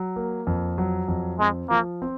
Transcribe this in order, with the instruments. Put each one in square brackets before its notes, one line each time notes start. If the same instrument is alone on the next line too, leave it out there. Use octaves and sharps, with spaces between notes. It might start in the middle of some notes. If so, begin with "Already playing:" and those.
Already playing: [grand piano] F#3
A#3
F2
F#3
F2
[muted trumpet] G#3 [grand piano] C4
[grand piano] F3 [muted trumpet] A#3
[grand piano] C4